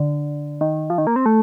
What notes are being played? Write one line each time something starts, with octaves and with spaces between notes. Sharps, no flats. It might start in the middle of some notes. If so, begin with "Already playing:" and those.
Already playing: D3
D#3
F3
D#3
A#3
C4
A3